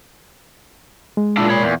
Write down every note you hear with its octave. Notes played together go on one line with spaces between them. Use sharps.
G#3
A#2 D4 E4
C#5 B5
E2